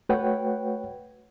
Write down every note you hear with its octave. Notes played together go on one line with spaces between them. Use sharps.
A3 F#4 B4 C#5 F#5 G5